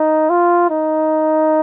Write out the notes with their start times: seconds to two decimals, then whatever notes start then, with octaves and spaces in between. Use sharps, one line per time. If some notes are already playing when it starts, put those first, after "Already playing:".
Already playing: D#4
0.30 F4
0.70 D#4